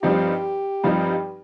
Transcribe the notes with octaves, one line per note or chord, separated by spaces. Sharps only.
G2 F3 C4 D#4 G4
G2 F3 C4 D#4